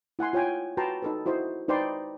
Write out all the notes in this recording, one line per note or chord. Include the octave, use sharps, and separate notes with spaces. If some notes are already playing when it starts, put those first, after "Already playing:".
E4 F#5 G#5 C6
F4 C#5 G5 G#5
F#4 B4 G5 A5 A#5 C6
D#4 A4 B4
E4 F#4 C5 D#5
D#4 B4 C5 D5 G5 C6